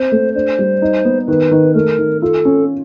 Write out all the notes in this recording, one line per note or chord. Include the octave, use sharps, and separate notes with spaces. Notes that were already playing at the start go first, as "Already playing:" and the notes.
Already playing: C4 C5
A3
D4 C5
G3
D#4
B3
D#3 B4
D#3
A3 A#4
D#3
F4 A4
C#4